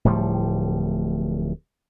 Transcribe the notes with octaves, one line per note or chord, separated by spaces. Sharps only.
D1 A2 F3 G3